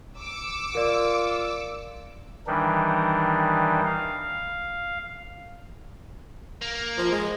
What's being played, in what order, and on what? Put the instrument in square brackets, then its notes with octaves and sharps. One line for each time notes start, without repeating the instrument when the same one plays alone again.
[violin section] D6 E6 C#7
[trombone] F4 [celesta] A#4 D5
[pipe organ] D#3 E3 G3 D4 D#4
F5
[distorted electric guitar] A#3
[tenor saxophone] F3
G#3